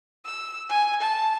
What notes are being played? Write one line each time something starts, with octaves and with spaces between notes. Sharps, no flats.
E6
G#5
A5